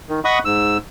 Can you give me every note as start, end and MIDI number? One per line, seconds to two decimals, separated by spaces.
0.09 0.20 51
0.25 0.39 75
0.25 0.39 78
0.25 0.39 83
0.25 0.39 85
0.25 0.39 87
0.45 0.77 44
0.45 0.77 88